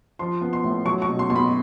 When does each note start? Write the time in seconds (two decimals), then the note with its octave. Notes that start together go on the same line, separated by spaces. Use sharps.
0.19 F3 C6
0.41 B3
0.53 C6
0.64 A2
0.85 F#3 C#6
1.02 C#6
1.08 B2
1.19 C6
1.30 B2 C6
1.36 B5